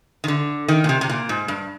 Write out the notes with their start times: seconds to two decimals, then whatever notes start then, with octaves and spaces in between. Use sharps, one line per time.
0.24 D#3
0.28 D3
0.68 D#3
0.84 A#2
0.89 C3
1.01 C3
1.09 A#2
1.29 G#2
1.48 G2